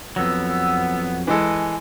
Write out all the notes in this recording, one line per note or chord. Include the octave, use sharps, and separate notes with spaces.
F2 F#3 B3 E6
E3 G#3 A4 G#5